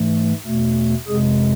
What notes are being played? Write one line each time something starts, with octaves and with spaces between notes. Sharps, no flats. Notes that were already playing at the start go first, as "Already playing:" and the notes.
Already playing: G#2 E3 A3
E2 B2 A3
F2 C3 G#3 G#4